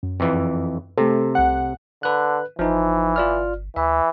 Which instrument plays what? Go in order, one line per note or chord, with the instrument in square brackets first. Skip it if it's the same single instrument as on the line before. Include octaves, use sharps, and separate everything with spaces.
[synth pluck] F#2
[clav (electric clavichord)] F2 E3
[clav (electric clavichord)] C3 [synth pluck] A3 A4
[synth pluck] C2 F#5
[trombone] D3 [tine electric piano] B4 F#6
[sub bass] G1 [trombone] E3 [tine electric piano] F3 D#4
[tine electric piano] F4 D5 F6
[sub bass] D2 [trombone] E3 [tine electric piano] E5